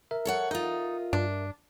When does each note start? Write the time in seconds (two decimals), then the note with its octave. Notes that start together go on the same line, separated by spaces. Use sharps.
0.11 A#4 E5
0.25 A4 C#5 F#5
0.51 D#4 F4 D#5
1.13 G2 D4